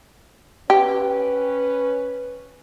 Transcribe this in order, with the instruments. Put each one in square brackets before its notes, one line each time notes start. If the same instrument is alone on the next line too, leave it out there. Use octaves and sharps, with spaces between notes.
[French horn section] C#4 B4 [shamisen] G4